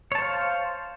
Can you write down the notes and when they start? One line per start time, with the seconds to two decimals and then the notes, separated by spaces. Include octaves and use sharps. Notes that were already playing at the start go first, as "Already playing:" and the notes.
0.12 C#5
0.15 A5
0.18 C5
0.22 F5